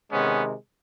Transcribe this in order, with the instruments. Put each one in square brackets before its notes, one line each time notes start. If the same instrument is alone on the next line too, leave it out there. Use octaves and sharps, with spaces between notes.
[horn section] C3 D#3 G#3 B3 C#4